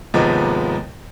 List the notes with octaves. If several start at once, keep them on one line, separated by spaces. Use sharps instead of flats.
D#2 G#2 C3 F3 G#3 B3